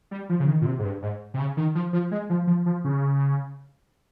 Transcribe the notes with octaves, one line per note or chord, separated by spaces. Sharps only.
G3
F3
C#3
D#3
A#2
C3
G#2
G2
G#2
C3
C#3
D#3
F3
F3
G#3
F3
F3
F3
C#3